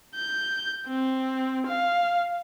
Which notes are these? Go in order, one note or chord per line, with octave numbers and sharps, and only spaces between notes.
G6
C4
F5